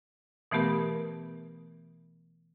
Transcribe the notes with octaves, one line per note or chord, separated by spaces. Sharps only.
B2 E3 A3 B3 G4 A#4